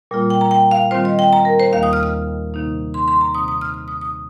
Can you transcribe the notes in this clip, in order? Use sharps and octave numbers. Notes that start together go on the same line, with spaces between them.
A#2 G3 A#3 F4
G5
A#5
G5
F5
D#3 G3 C4 F4 C5
D#5
G5
A#5
A#4
C5
D#2 D#3 G3 A#3 F5
D#6
F6
F6
C3 D#3 A#3 D#4
C6
C6
A#5
C3 D#3 C4 D#6
D#6
F6
F6
D#6
D#6